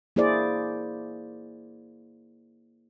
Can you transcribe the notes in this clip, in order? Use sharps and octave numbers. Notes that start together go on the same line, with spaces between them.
A#3 E4 G#4 C5 D5